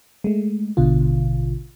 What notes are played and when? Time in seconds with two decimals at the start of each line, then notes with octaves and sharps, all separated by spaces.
0.24 G#3 A3
0.77 A1 B2 D3 F4